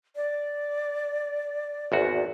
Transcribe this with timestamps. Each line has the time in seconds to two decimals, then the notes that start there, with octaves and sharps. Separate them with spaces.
0.16 D5
1.92 G#1 E2 F#4